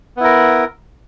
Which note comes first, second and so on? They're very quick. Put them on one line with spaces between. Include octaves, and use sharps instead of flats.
B3 E4 A#4